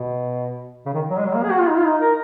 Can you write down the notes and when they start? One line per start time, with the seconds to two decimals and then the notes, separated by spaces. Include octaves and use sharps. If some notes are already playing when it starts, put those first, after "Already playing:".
Already playing: B2
0.86 C#3
0.94 D#3
1.10 F#3
1.19 G#3
1.26 F#3
1.35 A#3
1.43 G#4
1.51 F#4
1.60 F4
1.68 D#4
1.77 F4
1.85 D#4
2.01 A#4